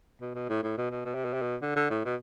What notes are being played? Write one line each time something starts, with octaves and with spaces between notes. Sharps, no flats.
B2
B2
A2
A2
B2
B2
B2
C3
B2
C3
B2
D3
D3
A2
B2